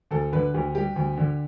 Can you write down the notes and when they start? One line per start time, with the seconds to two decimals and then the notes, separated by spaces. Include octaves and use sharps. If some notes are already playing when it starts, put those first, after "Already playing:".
0.11 D2 A4
0.32 D3 B4
0.54 D2 G4
0.75 G3 G4
0.96 D2
1.17 D3